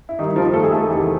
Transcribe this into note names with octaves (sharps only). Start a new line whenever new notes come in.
E4
G2 D#3 D#4
F3 F4
A3 A4
G#4
A3 A4
E2 C3 D#3